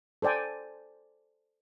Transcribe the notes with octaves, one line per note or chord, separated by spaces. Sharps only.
A4 C5 D5 G5 G#5